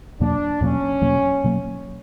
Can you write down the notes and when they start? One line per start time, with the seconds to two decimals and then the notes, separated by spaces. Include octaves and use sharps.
0.20 E2 B2 F#3 A#3 D4
0.61 E2 B2 F#3 A#3 C#4
1.02 E2 B2 F#3 A#3
1.44 B2 F#3 A#3